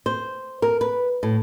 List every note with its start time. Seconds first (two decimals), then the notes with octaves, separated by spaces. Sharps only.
0.06 C5
0.62 A#4
0.81 B4
1.23 A2